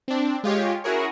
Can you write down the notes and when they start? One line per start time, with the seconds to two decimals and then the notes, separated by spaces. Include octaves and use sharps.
0.08 C4 D4
0.44 G#3 F4 G4 C#5
0.84 C#4 E4 F#4 G#4 A#4 C#5